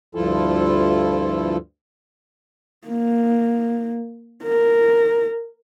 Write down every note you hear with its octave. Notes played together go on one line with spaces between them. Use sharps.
D2 G2 F3 E4 F4 A4
A#3
A#4